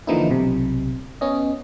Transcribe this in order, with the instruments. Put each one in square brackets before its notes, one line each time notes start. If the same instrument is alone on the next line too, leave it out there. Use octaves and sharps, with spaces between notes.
[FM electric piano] D3 E3 F3 A#3 D#4 E4
B1 C3
B3 C#4 D#5